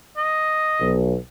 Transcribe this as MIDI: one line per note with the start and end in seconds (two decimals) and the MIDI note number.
0.17 0.95 75
0.80 1.15 35